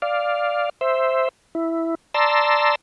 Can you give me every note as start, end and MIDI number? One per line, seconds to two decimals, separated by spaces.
0.02 0.69 74
0.02 0.69 77
0.81 1.29 72
0.81 1.29 76
1.55 1.95 64
2.14 2.75 74
2.14 2.75 81
2.14 2.75 82
2.14 2.75 84
2.14 2.75 88